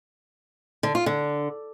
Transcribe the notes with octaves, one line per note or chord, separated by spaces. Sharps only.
D3
F4
D3